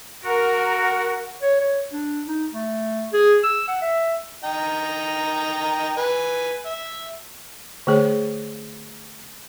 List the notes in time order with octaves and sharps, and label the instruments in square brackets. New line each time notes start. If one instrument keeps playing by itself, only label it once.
[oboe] F#4 [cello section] A#4 [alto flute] F#5
[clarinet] C#5
C#5
D4
D#4
A3
G#4
E6
F#5
E5
[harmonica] D#4 G5 A#5
B4 G#5
E5
[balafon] D3 A3 G#4 C#5